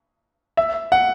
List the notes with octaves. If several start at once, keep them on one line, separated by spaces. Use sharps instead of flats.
E5
F#5